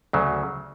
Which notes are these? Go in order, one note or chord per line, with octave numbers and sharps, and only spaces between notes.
D2 C#3 F#3